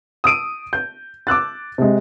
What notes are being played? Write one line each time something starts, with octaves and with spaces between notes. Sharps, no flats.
D#6 E6 D7 D#7
G6
D6 E6 F#6 A6
C3 G#3